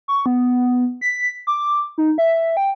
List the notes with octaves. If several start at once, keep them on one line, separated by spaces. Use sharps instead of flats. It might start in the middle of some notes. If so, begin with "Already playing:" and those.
C#6
B3
B6
D6
D#4
E5
G5